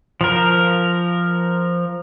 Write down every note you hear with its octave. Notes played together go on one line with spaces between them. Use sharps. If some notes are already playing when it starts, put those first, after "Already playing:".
F3 A#4